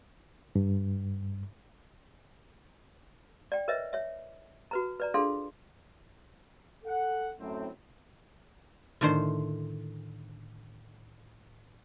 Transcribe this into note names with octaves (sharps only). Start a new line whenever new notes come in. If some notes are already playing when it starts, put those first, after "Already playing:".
G2
D5 G5
A#4 B4 C#5 D#5 E5
C#5 E5
F#4 B4 A#5
B4 D5 A#5
D4 F4 G#4 A4 F5 C6
A4 F#5
F#2 A2 C4
A2 D3 D#3 C5